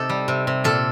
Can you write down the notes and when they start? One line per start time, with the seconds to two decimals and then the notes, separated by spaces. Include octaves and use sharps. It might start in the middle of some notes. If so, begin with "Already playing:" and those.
Already playing: C3 D#4 G4 A4
0.10 G3
0.28 C3
0.47 C3
0.64 A#2 A4